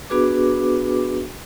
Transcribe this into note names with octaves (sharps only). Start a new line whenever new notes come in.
B3 D4 F#4 G#4 B4 D6